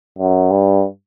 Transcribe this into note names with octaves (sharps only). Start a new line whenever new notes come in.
F#2
G2